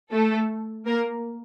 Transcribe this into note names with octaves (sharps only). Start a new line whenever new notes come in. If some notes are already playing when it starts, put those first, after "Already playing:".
A3 A4
A#3 A#4